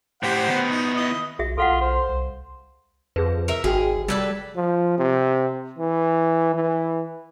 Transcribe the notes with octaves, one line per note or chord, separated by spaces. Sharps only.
A2 G4 C5 F#5 G5
D#3 B3
D#4
E4 D#5
B1 F#4 G#4 E5
B1 F4 A4 F5 F#5
C5
C2
F2 G#4 B4
A#4 E5
G#1 F#4 G#4 G5
G3 A4 B4 D5 E6 G#6 A6
F3
C3
E3
E3